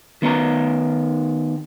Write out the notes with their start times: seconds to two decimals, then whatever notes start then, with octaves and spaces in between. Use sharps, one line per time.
0.22 D#3 B3 D#4 A#5